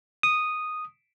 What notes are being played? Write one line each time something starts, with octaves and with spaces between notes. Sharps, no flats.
D#6